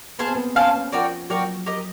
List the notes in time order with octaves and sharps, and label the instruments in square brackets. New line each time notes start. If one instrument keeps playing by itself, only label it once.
[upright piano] B3 [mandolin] G#4 C5 F5 A5
[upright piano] C4
B3
[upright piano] C#4 [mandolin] G#4 C5 F5 A5
[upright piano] B3
[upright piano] F3 [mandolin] F#4 A#4 D5 G5
[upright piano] F#3 [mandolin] F#4 A#4 D5 G5
[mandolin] G4 A#4 D#5